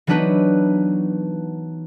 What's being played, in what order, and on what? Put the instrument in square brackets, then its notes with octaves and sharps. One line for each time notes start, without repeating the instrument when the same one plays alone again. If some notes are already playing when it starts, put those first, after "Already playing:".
[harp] E3 F#3 B3 D4 D#4 B4